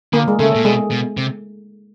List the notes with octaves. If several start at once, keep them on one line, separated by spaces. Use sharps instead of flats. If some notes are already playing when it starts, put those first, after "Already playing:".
D3 A#3
G#3
C#3 A3
A#2
B2 G#3
B2
C3